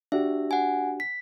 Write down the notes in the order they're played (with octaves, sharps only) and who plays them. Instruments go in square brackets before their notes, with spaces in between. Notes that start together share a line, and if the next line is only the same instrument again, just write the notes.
[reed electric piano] D4 F#4 G4 [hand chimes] E5
[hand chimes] F#5 G#5
B6